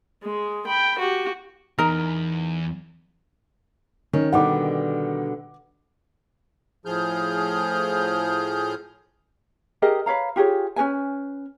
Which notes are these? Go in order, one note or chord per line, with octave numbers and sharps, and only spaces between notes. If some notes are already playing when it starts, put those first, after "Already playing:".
G#3 G#4
G5 B5
F#4 G4
E2 D#4 A#4
D#3 C#4
B2 D3 G3 F#5 D6
A2 F3 G#4 F6 G6
G4 G#4 A#4 D#5
B4 C#5 F5 A#5
F4 G4 G#4 C#5
C#4 A#4 B4 G#5